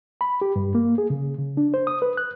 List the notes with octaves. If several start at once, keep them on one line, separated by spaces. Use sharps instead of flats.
B5
G4
G2
A#3
G#4
C#3
C#3
D4
C5
D#6
B4
F#6